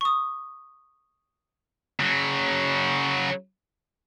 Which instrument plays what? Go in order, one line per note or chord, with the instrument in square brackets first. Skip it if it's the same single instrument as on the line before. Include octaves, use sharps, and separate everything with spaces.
[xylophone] C#6 D#6
[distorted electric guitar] C#3 F#3